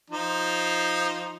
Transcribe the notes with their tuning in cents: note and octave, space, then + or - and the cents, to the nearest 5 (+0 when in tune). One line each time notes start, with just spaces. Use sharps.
F3 +0 D#4 +0